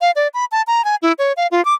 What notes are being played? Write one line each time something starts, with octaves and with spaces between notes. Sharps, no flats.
F5
D5
B5
A5
A#5
G#5
E4
C#5
F5
F4
D6